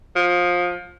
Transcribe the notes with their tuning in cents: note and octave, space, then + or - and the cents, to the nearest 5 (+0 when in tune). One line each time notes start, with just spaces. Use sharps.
F3 +20